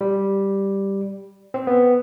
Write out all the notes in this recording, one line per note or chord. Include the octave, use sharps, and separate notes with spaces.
G3
C4
B3